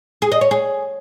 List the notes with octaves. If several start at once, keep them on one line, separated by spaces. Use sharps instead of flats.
G#4
D#5
C#5
G#4